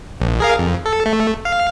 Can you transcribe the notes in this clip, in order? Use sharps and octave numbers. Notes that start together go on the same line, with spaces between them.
A#1
G#4 A#4 F5
F2
A4
A3
F5